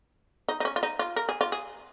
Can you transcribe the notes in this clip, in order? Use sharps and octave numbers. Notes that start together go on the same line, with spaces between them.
D#4
D#4
C#4
F4
D#4
F4
A#4
G#4
F4
G#4